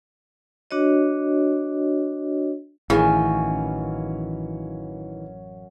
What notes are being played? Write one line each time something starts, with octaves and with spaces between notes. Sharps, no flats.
D4 F#4 C#5 D#5
A1 F#2 D#3 E3 C#4 E4 G#4 F5